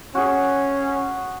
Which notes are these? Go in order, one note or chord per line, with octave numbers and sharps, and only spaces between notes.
C#4 F#4 G#4